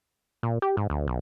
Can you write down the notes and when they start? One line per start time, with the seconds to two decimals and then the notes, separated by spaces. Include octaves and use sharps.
0.43 A#2
0.62 G4
0.77 G#2
0.90 D2
1.07 B1